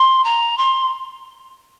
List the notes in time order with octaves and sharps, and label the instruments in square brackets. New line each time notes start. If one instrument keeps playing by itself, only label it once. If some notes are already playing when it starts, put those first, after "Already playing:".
Already playing: [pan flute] C6
A#5
C6